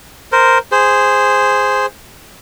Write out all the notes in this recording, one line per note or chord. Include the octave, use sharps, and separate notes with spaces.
A#4 C5
G#4 C5